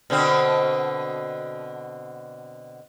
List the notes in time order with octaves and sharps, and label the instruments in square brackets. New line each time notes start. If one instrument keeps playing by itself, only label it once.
[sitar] B2 D3 C4